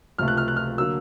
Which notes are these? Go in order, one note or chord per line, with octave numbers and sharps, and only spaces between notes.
C#2 C3 F3 A3 F6
F#6
F6
F#6
F6
D3 F#3 A#3 E6